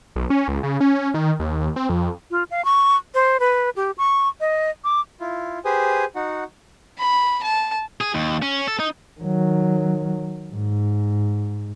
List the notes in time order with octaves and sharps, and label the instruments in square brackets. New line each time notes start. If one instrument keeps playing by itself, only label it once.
[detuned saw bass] B1
C#4
C#2
C#3
C#4
D#3
D#2
C4
F2
[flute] F4
F5
C#6
C5
B4
G4
C#6
D#5
D6
[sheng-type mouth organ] E4 F4
G4 G#4 B4 C5 G#5 D#6
D#4 F#4 F#5
[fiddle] B5
A5
[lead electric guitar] G#4
D#2
C#4
A4
D#4
[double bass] D#3 F#3
G#2